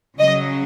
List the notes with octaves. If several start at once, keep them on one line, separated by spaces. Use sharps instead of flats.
C#3 F#3 D#5